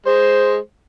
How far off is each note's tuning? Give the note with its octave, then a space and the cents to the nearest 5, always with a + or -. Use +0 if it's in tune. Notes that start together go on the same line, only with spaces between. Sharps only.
G#3 +0 C5 +0